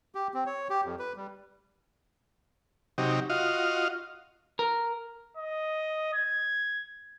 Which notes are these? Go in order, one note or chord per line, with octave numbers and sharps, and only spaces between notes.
G4
C4
C#5
G4
F2
B4
G3
C3 F#3 D#4 G4
F4 F#4 D#5 F5
A#4
D#5
G#6